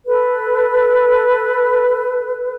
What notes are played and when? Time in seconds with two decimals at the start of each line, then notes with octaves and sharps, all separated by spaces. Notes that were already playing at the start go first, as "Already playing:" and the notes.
0.06 A4 B4